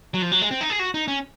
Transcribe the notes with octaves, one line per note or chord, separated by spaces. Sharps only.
F#3
F3
F#3
G#3
C4
D#4
G#4
F#4
D#4
C#4